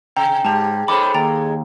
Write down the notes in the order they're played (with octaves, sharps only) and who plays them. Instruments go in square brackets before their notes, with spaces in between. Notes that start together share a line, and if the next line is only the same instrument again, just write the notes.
[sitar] C3 [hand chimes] G5 [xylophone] A#5
[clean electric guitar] G#2 [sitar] C#3 G4 [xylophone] A5 F7
[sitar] G#3 D#4 A4 [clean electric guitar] C5 C#5 B5 [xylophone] D6
[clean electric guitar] D#2 [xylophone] G5 A#5 A6